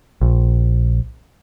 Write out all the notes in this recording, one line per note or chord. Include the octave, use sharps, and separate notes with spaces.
A#1